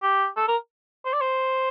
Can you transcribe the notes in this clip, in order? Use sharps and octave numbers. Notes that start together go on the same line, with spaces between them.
G4
A4
A#4
C5
D5
C5